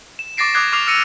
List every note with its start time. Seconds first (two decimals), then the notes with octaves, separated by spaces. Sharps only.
0.19 E7
0.37 C#6 D6 A6 A#6 C7 D7
0.54 D6 D#6 F#6 G#6 C7
0.72 C#6 D6 F6 C7 F7
0.87 E6 F6 A#6 C#7 D#7 F7